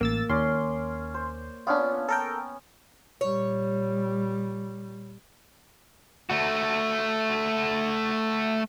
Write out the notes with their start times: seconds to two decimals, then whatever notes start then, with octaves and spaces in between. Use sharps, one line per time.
0.01 A1 A#3 E6 A6
0.30 D#2 C#4 D5 C6
1.14 C5
1.67 B3 C#4 D4 F4
2.09 A4 A#4 G5
3.21 A#2 G3 C#5
6.30 A3 F#4